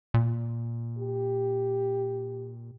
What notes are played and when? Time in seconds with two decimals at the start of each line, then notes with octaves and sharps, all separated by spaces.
0.14 A#2
0.99 G4